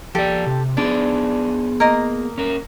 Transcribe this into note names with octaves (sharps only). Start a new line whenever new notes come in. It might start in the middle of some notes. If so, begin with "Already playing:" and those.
F3 G4 A4 D5
C3
B3 D4 F4 G#4
A#3 D#5
C#4 A#4